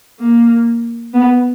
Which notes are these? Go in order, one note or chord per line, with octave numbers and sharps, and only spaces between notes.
A#3
B3